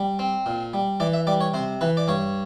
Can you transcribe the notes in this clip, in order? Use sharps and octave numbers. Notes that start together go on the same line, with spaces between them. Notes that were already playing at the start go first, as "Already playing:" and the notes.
Already playing: G3
C4
A#2
G3
E3 D5
E5
G3 D5
C#5
C3 C5
E3 B4
D5
G2 C#5